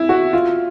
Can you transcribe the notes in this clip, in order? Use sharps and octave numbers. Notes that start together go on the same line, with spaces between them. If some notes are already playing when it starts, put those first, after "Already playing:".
Already playing: E4
F#4
F4